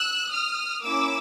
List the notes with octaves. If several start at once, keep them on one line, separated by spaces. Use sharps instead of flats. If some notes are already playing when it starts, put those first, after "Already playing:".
Already playing: E6 F#6
D#6 F6
A#3 C#4 E4 D6 E6